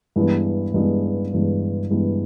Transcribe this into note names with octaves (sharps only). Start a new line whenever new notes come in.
G2 E3 G#3 B3
G2 E3 G#3 B3
G2 E3 G#3 B3
G2 E3 G#3 B3